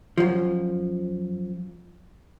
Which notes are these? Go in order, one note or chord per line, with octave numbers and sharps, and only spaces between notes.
F#2 F3